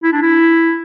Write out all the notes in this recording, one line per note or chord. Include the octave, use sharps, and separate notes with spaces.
E4
D4
E4